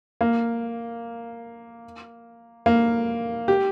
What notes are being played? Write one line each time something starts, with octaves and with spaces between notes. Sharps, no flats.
A#3
A#3
G4